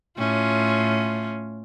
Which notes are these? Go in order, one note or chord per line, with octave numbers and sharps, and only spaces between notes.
A2 C#4 F4